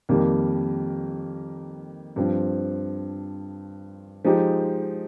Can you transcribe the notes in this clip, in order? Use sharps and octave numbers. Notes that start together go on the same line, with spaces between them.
F2 D#3 G3 A#3
G2 F3 C4
F3 G#3 D#4 G4